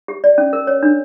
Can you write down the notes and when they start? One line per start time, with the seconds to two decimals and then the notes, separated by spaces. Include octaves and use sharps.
0.08 G4
0.24 D5
0.38 C#4
0.53 A#4
0.67 C#5
0.83 D4